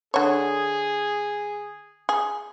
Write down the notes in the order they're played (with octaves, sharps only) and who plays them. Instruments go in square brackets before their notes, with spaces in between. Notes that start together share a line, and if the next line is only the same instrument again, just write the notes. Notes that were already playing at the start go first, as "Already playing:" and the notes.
[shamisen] D3 C#5 [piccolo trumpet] G#4
[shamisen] G#4